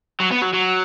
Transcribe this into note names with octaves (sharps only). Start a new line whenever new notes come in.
F#3
B3
F#3
F#3